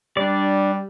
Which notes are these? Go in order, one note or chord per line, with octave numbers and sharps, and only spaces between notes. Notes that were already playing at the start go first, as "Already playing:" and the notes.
G3 D4 D5